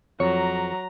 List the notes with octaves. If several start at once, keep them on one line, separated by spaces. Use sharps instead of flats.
F2 F#3 C#5 A#5